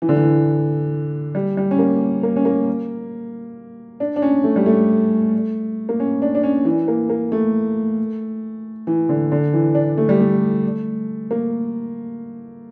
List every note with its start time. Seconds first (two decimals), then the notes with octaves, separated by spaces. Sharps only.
0.02 E3
0.09 D3
0.16 E3
1.35 G3
1.57 G3
1.71 C#4
1.79 A#3
2.23 A#3
2.36 C#4
2.45 A#3
4.00 D4
4.16 D4
4.22 C#4
4.44 A3
4.56 G3
4.66 A3
5.89 A#3
6.00 C#4
6.22 D4
6.35 D4
6.43 C#4
6.65 E3
6.88 A#3
7.09 A#3
7.32 A3
8.87 E3
9.09 D3
9.32 D3
9.54 E3
9.75 D4
9.98 A3
10.09 G3
10.20 A3
11.31 A#3